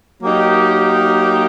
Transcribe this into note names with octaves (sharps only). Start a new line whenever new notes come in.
F#3 A#3 D#4 G4 A#4